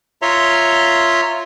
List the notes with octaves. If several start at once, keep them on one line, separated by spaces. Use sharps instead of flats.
F4 C#5 E5 A#5 C6